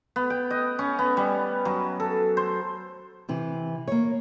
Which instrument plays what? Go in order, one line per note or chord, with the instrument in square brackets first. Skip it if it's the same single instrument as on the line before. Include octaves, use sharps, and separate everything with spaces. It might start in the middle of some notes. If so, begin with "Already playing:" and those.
[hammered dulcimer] B3
G5
D#5
C#4
B3
G3
F#3
A4
C5
[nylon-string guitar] C3 E3
A#3 C#5